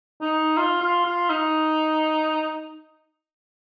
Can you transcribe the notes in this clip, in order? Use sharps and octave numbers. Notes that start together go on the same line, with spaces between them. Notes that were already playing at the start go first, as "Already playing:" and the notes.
D#4
F4
F4
F4
D#4